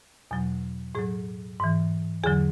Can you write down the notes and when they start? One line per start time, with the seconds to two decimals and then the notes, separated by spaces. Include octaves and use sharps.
0.31 E2 B2 F#3
0.95 A2 F#3 G#4
1.60 G#2 E3
2.23 E2 D3 F#3 G#4